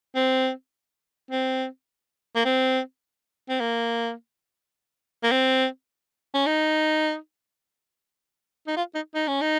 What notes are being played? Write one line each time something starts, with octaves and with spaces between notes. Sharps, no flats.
C4
C4
A#3
C4
C4
A#3
A#3
C4
C#4
D#4
D#4
F4
D#4
D#4
C#4
D#4